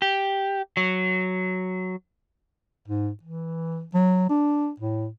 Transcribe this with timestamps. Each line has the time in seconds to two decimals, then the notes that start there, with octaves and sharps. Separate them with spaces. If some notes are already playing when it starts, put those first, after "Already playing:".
0.02 G4
0.77 F#3
2.88 G#2
3.23 E3
3.94 F#3
4.29 D4
4.80 A2